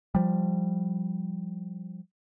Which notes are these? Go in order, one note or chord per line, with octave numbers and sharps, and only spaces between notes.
F3 G3